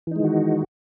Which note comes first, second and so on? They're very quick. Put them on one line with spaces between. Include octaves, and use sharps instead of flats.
E3 D#4 G#3 D#3 F#4